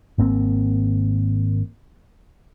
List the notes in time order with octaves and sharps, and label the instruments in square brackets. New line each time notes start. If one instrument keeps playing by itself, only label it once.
[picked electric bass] G#1 A#3 C4